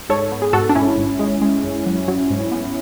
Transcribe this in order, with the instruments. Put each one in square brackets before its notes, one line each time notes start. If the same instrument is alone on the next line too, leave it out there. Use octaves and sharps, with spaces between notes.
[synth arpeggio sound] G#2 A4 C#5
B3
G#4
G#2 F#4 A4
D4
G#2 C#4 E4
G#1
G#3
G#3
F#2
F#3
F#3
G#2
B3